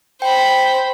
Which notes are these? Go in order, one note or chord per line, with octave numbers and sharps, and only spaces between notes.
C5 G5 B5